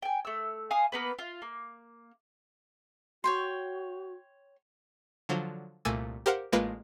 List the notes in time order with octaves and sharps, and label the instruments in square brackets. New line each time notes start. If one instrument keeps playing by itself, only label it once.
[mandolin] G5 G#5
A3 E6
F5 G#5 C6 D#6
A#3 B3 B4
F4
A#3
[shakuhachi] F#4 [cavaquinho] C#5 G5 C6
[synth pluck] D3 F3 F#3
C2 A#2 A3 G#5 E6 A6
G4 A#4 C5 F5 F#5
A1 G#3 A#3 F4 B4 F6